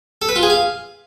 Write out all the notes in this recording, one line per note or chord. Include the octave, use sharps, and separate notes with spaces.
A4
B4
F4
G#4
F5